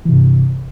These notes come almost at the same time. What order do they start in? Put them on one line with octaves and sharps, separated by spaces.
E3 C3 G2